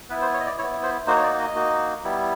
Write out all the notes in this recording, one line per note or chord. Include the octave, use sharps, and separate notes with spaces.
B3 E4 B4
C5
C#5
D#5
D5
B3 E4 C#5
C5
A#3 D#4 F#4 C5
C#5
D5
D#5
A#3 D#4 F#4
G3 B3 E4